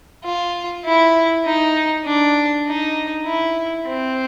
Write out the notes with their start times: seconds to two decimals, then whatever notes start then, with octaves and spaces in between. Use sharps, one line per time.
0.25 F4
0.85 E4
1.45 D#4
2.06 D4
2.67 D#4
3.26 E4
3.87 C4